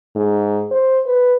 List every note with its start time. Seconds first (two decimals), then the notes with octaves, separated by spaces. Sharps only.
0.15 G#2
0.71 C5
1.06 B4